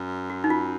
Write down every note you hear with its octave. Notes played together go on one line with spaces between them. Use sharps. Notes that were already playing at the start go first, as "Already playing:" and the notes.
Already playing: F#2
F#4
D#4
F4